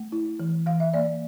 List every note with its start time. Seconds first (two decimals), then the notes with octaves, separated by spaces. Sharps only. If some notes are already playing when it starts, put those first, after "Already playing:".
Already playing: A3
0.12 E4
0.40 E3
0.67 E3 F5
0.80 E5
0.94 A#3 D5